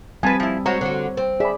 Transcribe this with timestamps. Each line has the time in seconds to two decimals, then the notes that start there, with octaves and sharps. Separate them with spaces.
0.23 F3 G3 C4 B4 G#5 A5
0.40 F3 E4
0.66 G#3 C4 F#4 C#5 A#5
0.81 D3 F#4 C5
1.17 C4
1.40 G#4 D5 E5 B5